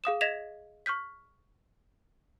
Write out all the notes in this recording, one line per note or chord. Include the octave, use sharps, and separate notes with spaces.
G#4 F5 D#6 E7
D#5 G#6 A#6 B6 E7 F7
C#6 F6 G6 B6